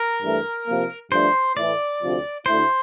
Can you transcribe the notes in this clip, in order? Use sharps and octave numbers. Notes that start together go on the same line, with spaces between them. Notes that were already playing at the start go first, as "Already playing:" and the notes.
Already playing: A#4
G2 E3 A3
C3 F3 A#3
G2 F3 A3 D4 C5
A2 E3 A3 E4 D5
D2 C3 F3 C4
D2 D3 A3 E4 C5